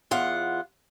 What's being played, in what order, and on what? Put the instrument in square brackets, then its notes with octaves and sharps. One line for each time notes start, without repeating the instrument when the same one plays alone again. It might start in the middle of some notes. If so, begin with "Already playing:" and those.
[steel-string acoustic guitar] E2 F4 F#5